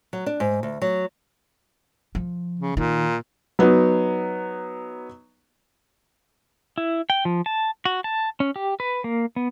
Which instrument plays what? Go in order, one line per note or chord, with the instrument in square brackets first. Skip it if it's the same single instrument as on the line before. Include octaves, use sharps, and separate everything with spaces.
[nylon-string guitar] F#3
D4
G#2
D2
F#3
[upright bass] F3
[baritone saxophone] C#3
[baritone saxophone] A#2 [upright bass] D#3
[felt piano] F#3 B3 D#4
[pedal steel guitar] E4
G5
F3
A5
F#4
A5
C#4
G4
B4
A#3
B3